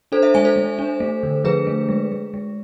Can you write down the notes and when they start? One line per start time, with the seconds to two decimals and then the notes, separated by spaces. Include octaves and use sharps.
0.12 D4 A4 C5
0.22 C5 E5
0.34 G#3 E5 G#5
0.45 A4 C5
0.56 G#3
0.79 D4
1.00 A3
1.23 D3
1.44 F3 G#4 B4
1.67 A3
1.89 G#3
2.12 G#3
2.34 G#3